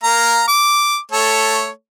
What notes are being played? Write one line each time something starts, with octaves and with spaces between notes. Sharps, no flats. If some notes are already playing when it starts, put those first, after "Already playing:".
A#3 F5 A#5
D6
A3 A4 C#5